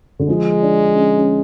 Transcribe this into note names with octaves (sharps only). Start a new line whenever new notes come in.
D3
F3 G#3
D4
C#4
C#4